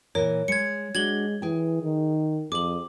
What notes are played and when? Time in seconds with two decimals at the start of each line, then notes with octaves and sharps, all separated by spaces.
0.15 A#2 E3 A#4 C#5
0.48 G#3 G#6 C#7
0.95 G#3 D4 F#4 G#6 F#7 G7
1.42 E3 G#4 G5
1.83 D#3
2.52 F2 G#4 D6 F#7